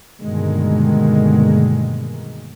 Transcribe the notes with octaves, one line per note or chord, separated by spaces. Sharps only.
G2 B2 D3 D#3 G#3 A#3